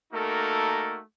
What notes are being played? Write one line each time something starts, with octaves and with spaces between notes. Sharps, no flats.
A3 A#3 D#4 F#4 A4 A#4